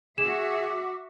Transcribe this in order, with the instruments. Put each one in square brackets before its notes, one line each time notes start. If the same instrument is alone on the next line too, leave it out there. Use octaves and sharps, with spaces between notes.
[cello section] F#4 E5 [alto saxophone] G#4 [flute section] D6 [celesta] E7